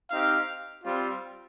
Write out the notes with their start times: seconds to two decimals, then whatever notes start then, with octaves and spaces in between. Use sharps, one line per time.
0.11 C4 D#4 G4 F5
0.84 G3 C4 F4